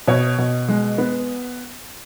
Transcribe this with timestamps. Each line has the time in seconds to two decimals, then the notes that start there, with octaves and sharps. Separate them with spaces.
0.08 B2 C#5
0.38 B2
0.69 G#3
0.98 B3